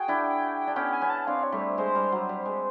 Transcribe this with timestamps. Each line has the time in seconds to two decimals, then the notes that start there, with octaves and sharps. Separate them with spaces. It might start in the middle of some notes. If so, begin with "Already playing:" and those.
Already playing: F#4 G#4 G5
0.08 D4 E4
0.67 D4
0.76 B3 C#4 G5
0.93 G#5
1.02 B3 C#4
1.10 A5
1.27 C4 D4 F5
1.44 C#5
1.52 G3 A3
1.61 C5
1.78 G#3 C5
1.95 G3
2.12 F#3
2.29 G3
2.45 G#3